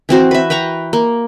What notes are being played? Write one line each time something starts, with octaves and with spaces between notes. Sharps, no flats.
E3 C4 F#4 C5
B4 E5
B4 G5 A#5 C#6
A#3